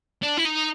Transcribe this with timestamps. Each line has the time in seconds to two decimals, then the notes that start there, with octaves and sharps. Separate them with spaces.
0.23 D4
0.38 E4
0.45 D#4